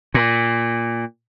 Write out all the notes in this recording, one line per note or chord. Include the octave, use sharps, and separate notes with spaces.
A#2